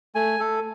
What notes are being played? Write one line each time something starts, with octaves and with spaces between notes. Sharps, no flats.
A3 G#5
A3 A4